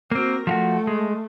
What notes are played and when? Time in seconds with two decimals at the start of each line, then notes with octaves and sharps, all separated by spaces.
0.12 A#3 C4 F#4 A#4
0.47 F3 A3 F4 F#4
0.87 G#3